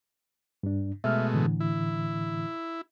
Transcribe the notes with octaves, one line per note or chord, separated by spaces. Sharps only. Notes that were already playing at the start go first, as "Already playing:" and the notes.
G2 D4
B2 G#3 A3 E5 F6
A2 D3 E3
E4